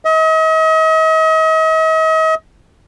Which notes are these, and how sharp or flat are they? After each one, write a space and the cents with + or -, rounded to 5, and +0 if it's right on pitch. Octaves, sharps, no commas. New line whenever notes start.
D#5 +40